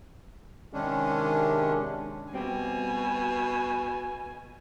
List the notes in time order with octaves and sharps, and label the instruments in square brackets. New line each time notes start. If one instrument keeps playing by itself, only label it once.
[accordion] C3 D#3 G#3 C#4 D4
[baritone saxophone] B2 [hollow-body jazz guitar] G3 C4 G4 [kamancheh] G#5